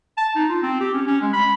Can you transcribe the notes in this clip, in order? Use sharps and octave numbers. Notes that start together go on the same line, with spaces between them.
A5
D#4
F4
C4
G4
C#4
C#4
G#3
B5